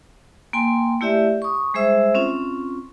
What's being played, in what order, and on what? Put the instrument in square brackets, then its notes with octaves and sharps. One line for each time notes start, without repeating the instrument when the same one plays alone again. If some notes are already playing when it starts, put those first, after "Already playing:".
[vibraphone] A#3 G5 G#5 C6
A3 E4 G4 D5 E5
C#6 D#6
G3 G#3 G#4 C5 E5 E6
C4 C#4 F4